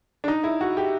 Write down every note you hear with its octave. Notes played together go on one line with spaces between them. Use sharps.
D4
D#4
E4
F#4
G4